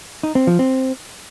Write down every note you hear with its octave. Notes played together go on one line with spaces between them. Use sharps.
D#4
C4
F3
C4